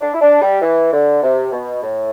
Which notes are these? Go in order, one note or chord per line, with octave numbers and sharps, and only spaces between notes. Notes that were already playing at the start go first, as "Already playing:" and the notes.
D4
E4
D4
G3
E3
D3
C3
B2
A2